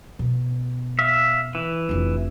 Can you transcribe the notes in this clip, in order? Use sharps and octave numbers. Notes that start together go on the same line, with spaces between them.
B2
E5 F5
E3
F1 D3